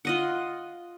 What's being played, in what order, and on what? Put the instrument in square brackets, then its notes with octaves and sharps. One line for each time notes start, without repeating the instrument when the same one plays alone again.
[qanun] F4 D#5 F#5